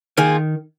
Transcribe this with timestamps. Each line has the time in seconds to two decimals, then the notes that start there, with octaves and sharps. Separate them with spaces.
0.17 D#3 A#3 F4 G#4